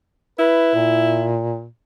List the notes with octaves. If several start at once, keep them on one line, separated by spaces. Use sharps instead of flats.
E4 B4
A#2